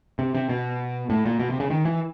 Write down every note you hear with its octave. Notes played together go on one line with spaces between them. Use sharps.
C3
C3
B2
A2
A#2
B2
C3
C#3
D#3
E3